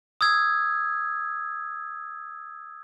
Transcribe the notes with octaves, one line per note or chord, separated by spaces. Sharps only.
D#6 E6 G#6